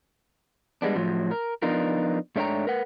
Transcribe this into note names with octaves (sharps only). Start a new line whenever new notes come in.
G3 G#3 B3 D4
A2 F3 F#3
A#4
F3 B3 D4 D#4 F4 A#4
G#2 A3 D4 C#5 G5 A#5
A#4 B4 F#5